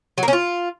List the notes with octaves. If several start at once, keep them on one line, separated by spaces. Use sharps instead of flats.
F#3
A#3
C#4
F4